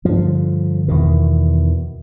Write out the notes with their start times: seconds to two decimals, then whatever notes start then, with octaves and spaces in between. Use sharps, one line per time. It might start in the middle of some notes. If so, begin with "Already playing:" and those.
0.05 G2 D3 F3
0.88 E2 B2 D#3